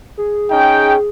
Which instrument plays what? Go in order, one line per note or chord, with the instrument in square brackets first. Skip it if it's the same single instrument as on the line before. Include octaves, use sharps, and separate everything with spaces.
[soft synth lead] G#4
[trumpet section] C#4 D#4 G5